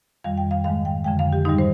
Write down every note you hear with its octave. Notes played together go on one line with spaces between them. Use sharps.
F2 D#3 G3 F5
G5
F5
G#2 D#3 G#3 F5
G5
F2 D3 F3 G#3 G5
F5
G4
G#2 D#3 G3 D#4
C5